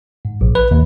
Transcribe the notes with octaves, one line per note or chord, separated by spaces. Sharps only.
G#2
A#1
B4
D#2